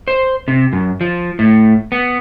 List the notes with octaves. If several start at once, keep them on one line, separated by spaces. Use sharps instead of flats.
C5
C3
F#2
F3
A2
B3